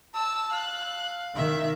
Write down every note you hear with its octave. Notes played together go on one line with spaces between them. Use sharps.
A5 E6
F5 F#6
D#3 E5